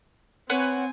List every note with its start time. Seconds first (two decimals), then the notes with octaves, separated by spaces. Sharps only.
0.49 C4 B4 C#5 F#5 G#5